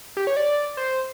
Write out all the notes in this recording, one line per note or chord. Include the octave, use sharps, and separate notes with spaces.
G4
C#5
D5
C5